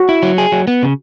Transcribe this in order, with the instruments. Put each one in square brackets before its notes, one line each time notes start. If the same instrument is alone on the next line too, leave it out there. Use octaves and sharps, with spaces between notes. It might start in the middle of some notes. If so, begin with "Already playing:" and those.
Already playing: [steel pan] F#4
[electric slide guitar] E4
F#3
G#4
F#3
B3
C#3